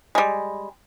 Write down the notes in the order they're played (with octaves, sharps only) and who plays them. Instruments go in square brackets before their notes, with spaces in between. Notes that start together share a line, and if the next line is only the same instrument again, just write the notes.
[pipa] G3 G#3